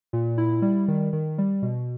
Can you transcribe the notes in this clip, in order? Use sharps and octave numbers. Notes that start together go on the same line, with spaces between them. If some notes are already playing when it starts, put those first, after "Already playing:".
A#2
E4
G3
D#3
D#3
G3
B2